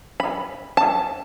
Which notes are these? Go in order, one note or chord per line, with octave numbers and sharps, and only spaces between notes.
B5
A5